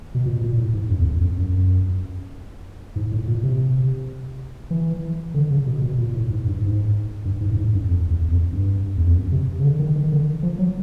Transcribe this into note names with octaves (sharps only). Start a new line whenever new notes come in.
B2
A#2
A#2
A2
G#2
F#2
E2
F2
F2
F#2
G#2
A2
A#2
C3
E3
D3
C#3
B2
B2
A#2
A2
G#2
G2
G#2
G2
G#2
G2
G#2
F#2
F2
E2
F2
G2
E2
F2
F#2
C3
C#3
D3
D#3
D#3
D3
F3
F#3